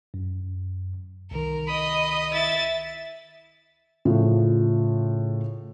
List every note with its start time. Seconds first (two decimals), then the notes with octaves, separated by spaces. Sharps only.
0.14 F#2
1.31 C2 D#3 A#4
1.68 D#5 B5 D#6
2.33 E4 E5 A6
4.05 A2 C#3 F3 F4